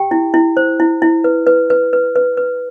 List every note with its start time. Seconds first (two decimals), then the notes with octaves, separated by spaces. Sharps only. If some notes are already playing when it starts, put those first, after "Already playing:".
Already playing: G4 G5
0.11 E4
0.34 E4
0.57 C5
0.80 E4
1.02 E4
1.24 B4
1.47 B4
1.70 B4
1.93 B4
2.15 B4
2.37 B4